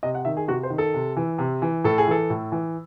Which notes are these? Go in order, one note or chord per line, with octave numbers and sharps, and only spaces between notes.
C3 D#5
F#5
D#3 E5
G#4
C3 F#4
C5
D#3
A4
C3
E3
C3
E3
A2 A4
G#4
E3 A4
A2
E3